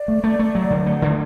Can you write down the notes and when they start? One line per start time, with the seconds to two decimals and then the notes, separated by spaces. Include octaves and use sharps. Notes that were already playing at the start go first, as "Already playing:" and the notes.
Already playing: D5
0.08 A3
0.24 A3
0.39 A3
0.55 F#3
0.70 D3
0.86 A3
1.02 D3